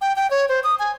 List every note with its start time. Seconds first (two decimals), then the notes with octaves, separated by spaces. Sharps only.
0.01 G5
0.16 G5
0.31 C#5
0.49 C5
0.64 D#6
0.79 G#5